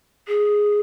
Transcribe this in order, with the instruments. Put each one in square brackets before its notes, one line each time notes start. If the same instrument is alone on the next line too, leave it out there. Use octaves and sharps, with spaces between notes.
[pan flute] G#4